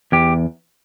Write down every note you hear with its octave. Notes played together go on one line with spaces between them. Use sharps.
E2 G4